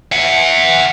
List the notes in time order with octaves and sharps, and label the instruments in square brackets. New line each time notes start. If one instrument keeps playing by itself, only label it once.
[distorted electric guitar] E5 F#5